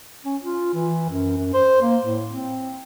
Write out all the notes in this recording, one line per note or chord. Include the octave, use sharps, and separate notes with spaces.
C#4
F4
E3
F#2
F#2
C5
A#3
A2
C4